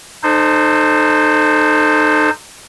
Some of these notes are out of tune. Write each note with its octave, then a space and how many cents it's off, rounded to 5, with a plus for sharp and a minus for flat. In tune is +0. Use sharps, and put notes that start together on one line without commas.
D#4 -30 A4 +0 C5 +0